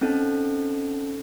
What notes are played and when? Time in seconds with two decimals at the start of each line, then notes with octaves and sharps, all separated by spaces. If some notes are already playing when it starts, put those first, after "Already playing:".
0.01 C4 C#4 D#4 A4